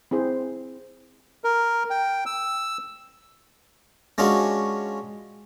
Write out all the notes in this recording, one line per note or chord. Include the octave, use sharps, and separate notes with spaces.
C4 E4 G#4 C5
A#4
G5
E6
G#3 C#4 D4 F4 F#4